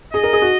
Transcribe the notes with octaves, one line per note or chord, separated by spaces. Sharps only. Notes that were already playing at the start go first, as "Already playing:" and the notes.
G#4 D#5
A#4
G#4
F#4